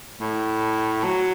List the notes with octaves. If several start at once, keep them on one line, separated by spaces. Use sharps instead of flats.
A2
F#3